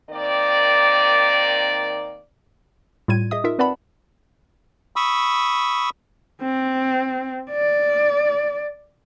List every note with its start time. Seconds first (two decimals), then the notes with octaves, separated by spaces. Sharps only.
0.10 D#3 A#3 C4 D5
3.08 A2 G3 F4 G#6 D#7
3.31 G#4 D#5 E5 D#6
3.44 D#4 F4 A#4 E5
3.59 C4 B4 D5 F#5 A5 B5
4.96 B5 C#6 D#6 E6
6.42 C4
7.50 D5